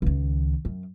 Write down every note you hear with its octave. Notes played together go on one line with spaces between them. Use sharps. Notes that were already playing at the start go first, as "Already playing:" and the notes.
C#2 D#3
F#2